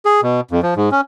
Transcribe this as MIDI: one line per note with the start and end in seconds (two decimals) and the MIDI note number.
0.05 0.21 68
0.23 0.41 47
0.51 0.61 41
0.63 0.74 53
0.77 0.89 44
0.91 1.01 61